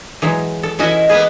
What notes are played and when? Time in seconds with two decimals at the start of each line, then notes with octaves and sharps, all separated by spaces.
0.22 E3 F#3 G#3
0.63 A4
0.79 E3 C#4 E4 F#4 D#5
1.09 G#3 A#3 B3 G#4 B4